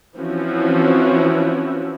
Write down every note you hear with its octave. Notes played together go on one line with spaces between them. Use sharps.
E3 F3 C4 C#4 E4 F#4